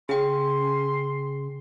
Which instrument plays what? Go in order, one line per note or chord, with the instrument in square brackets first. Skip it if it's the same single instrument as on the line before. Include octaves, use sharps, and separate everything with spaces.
[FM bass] C#3 [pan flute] C#4 [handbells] G#4 G5 [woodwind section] C6